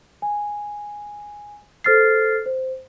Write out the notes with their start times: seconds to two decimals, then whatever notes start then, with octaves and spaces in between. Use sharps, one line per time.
0.22 G#5
1.84 A4 C5 F6 A6 C7
2.46 C5